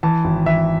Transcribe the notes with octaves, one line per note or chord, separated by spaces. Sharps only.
E3 A5
G#1
E3 E5